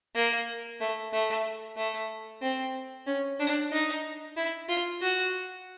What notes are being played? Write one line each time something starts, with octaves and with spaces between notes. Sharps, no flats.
A#3
A3
A3
A3
C4
C#4
D4
D#4
E4
F4
F#4